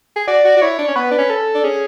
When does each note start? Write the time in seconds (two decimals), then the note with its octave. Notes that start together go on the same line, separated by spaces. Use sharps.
0.16 G#4
0.28 F#4 D5
0.44 F#4
0.57 F#4
0.62 E4 C#5
0.79 D4
0.88 C#4
0.96 B3 B4
1.11 D4
1.18 C#4
1.30 A4
1.55 D4
1.64 C#4 G#4